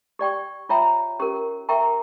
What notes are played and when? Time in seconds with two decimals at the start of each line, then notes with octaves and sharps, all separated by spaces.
0.19 G4 D5 G5 C#6
0.69 F4 C#5 E5 G5 A#5
1.19 C#4 G4 A#4
1.69 A#4 E5 G5 A#5 C#6